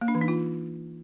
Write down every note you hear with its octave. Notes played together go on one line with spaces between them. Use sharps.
A#3
D4
E3
D#4
F4